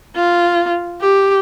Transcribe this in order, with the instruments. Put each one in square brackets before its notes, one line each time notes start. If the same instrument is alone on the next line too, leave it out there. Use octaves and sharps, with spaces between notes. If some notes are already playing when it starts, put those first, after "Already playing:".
[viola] F4
G4